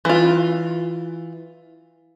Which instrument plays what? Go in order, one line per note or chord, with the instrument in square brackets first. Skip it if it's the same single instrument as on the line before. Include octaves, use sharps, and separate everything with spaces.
[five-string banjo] E3 F4